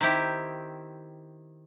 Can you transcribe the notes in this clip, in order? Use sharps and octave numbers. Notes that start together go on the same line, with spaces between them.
D#3 C4 E4 G4